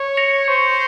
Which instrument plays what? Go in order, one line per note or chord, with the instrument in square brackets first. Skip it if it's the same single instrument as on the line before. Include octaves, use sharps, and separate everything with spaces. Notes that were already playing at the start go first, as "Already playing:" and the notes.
Already playing: [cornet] C#5
[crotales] A#6 C#7 F7
[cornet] C5 [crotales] C#6